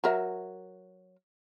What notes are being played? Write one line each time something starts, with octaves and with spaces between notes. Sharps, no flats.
F#3 A#4 E5